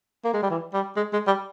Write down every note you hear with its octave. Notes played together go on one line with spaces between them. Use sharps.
A#3
G#3
G3
E3
G3
G#3
G#3
G3